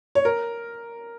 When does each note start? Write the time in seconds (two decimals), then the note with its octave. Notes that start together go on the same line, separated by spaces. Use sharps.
0.15 C#5
0.25 A#4